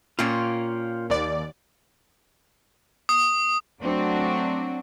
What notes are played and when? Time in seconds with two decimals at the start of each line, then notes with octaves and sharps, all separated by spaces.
0.19 A#2 A#3 C#4 F4 G5 C6
1.10 D#2 D5
3.09 D#6
3.83 F#3 A3 C4 D4 F#4